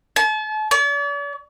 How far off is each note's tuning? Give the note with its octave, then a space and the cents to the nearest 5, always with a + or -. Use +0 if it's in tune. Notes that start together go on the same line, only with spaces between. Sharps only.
A5 -40
D5 -45